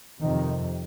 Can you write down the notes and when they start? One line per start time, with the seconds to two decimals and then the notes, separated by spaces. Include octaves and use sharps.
0.21 F2 C3 D#3